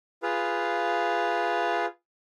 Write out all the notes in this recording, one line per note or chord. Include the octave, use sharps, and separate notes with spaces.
F4 G#4 B4 F5